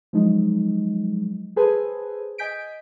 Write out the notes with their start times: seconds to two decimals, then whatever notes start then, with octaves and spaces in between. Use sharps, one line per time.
0.13 F3 F#3 G#3 D#4
1.56 G#4 A4 B4 C5 G#5
2.38 D#5 G#5 G6 B6 D7